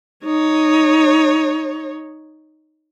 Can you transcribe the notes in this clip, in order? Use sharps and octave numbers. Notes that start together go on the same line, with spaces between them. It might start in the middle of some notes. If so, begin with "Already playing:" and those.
D#4 C#5